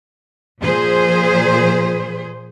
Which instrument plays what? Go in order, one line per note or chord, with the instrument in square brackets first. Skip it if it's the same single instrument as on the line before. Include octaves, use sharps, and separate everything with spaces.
[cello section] A#2 F3 G#4 C5